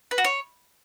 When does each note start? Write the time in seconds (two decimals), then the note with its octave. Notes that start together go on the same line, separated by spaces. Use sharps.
0.11 B4
0.18 F#4
0.25 C#5